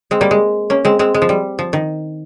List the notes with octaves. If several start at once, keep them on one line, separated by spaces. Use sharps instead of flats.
G#3 C4
G3 A#3
G#3
A#3 C#4
G#3 C4
G#3 C4
G#3
F3
G3
F3
D#3